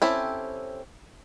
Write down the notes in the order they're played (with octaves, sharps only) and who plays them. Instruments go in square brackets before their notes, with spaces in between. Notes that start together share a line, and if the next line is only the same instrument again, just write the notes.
[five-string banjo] C4 C#4 E4 G4 A4